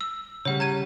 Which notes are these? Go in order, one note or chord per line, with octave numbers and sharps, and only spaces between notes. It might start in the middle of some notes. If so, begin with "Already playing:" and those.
E6
C#3 G3 C#5 F#5
A#5 G#6 D#7